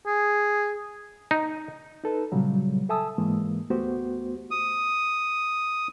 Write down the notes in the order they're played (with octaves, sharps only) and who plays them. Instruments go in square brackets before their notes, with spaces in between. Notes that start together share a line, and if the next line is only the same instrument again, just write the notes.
[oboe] G#4
[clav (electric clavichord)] D#4
[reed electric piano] D#4 A4 B4
A#2 C#3 F#3 G3
A4 E5 G#5 A5 D#6 E6
G#2 E3 G#3 A#3
D2 A3 B3 F#4 G4 C5
[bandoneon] D#6